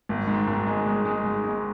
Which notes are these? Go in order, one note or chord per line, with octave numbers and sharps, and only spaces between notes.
G#1
G#2
G#1
G#3
G#3
G#3
G#2
G#3